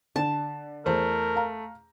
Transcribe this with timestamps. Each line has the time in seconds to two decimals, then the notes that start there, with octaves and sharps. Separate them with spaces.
0.16 D3 A5
0.86 E2 A3 A#4 C5
1.36 F5 A#5